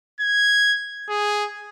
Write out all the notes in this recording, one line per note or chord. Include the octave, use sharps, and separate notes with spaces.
G#6
G#4